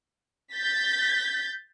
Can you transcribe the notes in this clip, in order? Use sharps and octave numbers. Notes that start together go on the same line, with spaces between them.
G6 A6 B6